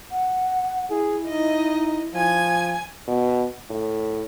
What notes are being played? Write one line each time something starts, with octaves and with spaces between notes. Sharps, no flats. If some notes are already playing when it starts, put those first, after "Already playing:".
F#5
E4 G#4
D#4 D#5
F3 G#5 G#6
B2
A2